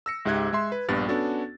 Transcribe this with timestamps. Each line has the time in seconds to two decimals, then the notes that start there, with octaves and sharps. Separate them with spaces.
0.06 E6 A#6 C#7
0.25 C#2 G#2 G4 E5 F#6 G#6
0.53 G#3 E5 C6
0.72 B4
0.89 A#1 G2 G3 B3 A6
1.08 B3 C#4 D4 F#4 A4